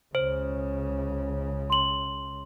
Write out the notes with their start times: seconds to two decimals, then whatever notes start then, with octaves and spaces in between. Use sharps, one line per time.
0.15 C#2 C#3 C5
1.70 C6 F#7